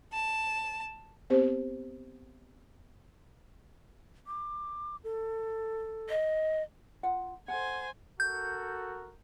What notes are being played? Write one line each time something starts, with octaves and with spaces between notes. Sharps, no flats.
A5
B3 C4 G4 C5
D6
A4
D#5
F4 F#5
A4 C5 F#5 G#5
F#4 A4 A#4 G6